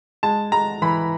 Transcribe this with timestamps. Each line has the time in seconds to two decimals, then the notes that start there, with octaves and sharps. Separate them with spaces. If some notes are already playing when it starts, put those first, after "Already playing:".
0.23 G#3 A5
0.52 G#3 A#5
0.82 E3 B5